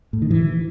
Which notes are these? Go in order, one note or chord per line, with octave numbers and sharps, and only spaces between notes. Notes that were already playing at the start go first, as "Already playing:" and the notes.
A2
D#3
E3